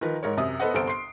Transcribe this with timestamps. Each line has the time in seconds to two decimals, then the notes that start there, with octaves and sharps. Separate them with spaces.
0.01 D#3 F3 A#4 B4
0.23 G#2 A#4 C#5
0.37 F#2 C3 D#6
0.60 B3 A4 B4 C5 D#5 F#5
0.73 G1 C2 A4 C5 D7
0.87 C6 C7